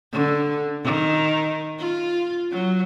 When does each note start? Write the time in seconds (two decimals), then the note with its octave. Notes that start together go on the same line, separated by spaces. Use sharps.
0.12 D3
0.84 D#3
1.79 F4
2.52 F#3